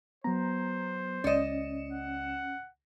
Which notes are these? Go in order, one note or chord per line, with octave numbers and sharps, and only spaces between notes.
F#3 B3 C5 A#5
C#2 C#4 D5 D#5 C#7 E7
F#5